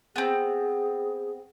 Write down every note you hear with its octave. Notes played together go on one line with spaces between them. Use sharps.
B3 C4 G#4